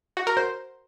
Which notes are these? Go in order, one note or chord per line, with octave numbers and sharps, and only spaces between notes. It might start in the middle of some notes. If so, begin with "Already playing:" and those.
F#4
A#4
C5